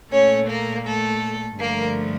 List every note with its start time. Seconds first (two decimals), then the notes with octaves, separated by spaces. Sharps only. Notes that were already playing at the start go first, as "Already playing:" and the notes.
0.11 A#2 A3 C#4 C#5
0.48 A#3 A#4
0.85 A3 A4
1.58 G2 D3 F3 A3 A#3 A#4